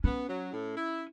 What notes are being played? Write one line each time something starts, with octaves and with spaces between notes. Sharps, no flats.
B3 C#4
F#3
A2
E4